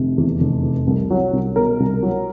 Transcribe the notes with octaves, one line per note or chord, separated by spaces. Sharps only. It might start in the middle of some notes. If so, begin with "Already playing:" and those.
Already playing: F1 C3
E2
F1
C3
C2
F#3
C2
B2 A#4
C2
F#3